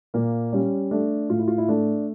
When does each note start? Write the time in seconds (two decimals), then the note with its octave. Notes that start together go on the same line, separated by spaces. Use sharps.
0.14 A#2 A#3
0.52 G3 C#4
0.91 A3 D4
1.30 A2 F4
1.39 E4
1.48 F4
1.58 E4
1.68 A3 D4